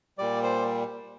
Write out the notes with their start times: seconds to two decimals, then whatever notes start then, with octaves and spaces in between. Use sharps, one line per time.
0.18 A#2 G3 D5
0.43 C5